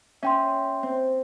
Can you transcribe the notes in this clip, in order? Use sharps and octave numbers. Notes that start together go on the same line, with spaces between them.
C#4 E5 G5 C6
C4